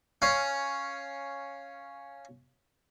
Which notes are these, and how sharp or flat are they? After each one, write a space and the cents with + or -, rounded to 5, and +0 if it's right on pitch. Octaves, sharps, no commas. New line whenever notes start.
C#4 +0 F5 +0